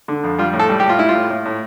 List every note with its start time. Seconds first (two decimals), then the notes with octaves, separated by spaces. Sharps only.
0.08 D3
0.24 F2
0.38 G3 F4
0.53 A2
0.59 A4
0.69 G3
0.80 G4
0.85 A2 F4
0.99 G3 E4
1.09 F4
1.15 A2
1.30 A2
1.45 A2